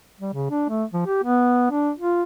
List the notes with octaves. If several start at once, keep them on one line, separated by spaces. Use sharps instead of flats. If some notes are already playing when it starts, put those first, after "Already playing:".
G3
C#3
D4
A3
F3
G4
B3
D4
F4